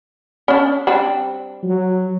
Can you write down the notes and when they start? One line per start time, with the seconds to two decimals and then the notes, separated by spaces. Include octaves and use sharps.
0.48 C#4 D4
0.87 G3 C4 D4
1.63 F#3